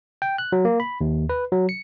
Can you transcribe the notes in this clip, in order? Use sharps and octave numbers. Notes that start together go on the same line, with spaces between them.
G5
F#6
F#3
A#3
B5
D#2
B4
F#3
C#7